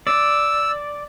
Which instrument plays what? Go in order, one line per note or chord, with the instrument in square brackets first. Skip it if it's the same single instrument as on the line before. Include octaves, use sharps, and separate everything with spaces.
[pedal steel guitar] D5 [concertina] E6